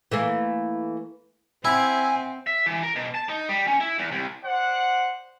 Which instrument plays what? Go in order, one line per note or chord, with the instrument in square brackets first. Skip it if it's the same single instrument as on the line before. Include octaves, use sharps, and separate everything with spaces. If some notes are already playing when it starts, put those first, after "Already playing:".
[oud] E3 A3 A#3
[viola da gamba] C4 [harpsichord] E4 [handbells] E5 F#5 [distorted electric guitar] G#5
[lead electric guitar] E5
E3
A#4
B2
A5
D#4
G3
C#4
E4
E2
C2
[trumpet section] C5 D5 F#5